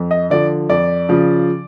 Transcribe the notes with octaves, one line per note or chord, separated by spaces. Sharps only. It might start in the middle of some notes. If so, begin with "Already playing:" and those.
Already playing: F2
D#5
D3 F3 D5
F2 D5
C#3 F3